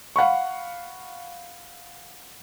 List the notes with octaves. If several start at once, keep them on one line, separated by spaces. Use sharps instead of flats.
F5 F#5 B5 C#6